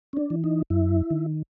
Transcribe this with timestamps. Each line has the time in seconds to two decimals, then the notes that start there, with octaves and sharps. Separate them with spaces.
0.13 C#4
0.17 D4
0.30 E3
0.44 D#4
0.70 F#2 E4
1.10 D#3